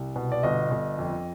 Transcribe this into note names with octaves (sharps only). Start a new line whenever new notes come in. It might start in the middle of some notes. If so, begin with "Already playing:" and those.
Already playing: C2
B2
D5
G1 D#5
G1
F2